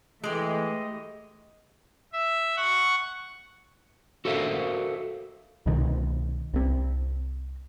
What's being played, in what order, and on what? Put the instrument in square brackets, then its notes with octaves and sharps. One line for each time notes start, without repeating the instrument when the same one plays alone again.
[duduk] E3 [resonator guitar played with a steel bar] G#3 G4 [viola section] A3 [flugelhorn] D#5
[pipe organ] E5
F#5 C#6
[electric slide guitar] F#4 A4 A#4 C5 E5 F5
[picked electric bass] C2 B2 D#3
C2 C4